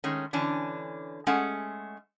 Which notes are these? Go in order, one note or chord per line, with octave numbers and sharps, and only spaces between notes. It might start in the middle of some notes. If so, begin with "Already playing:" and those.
D#3 G#3 A3 C#4
D3 E3 C#4 D4
G#3 A3 C#4 G#4 F#5